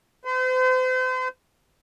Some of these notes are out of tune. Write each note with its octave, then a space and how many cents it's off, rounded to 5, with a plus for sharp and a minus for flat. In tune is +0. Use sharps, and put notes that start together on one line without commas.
C5 -40